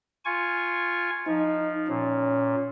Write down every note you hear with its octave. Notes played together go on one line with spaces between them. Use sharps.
F4 G#5 C#6
F3 D#4
A#2 C#4